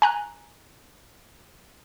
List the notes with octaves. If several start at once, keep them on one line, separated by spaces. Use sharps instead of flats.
G#5 A#5 F#6